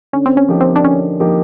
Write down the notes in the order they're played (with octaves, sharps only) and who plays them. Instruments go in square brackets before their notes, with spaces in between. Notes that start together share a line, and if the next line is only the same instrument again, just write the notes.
[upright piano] D3 [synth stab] C#4
[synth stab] C4
C#4
[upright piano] F3 A#3 D#4 G4
[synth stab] C4
D4
[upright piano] D3 [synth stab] C#4
[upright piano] F3 A#3 D#4 G4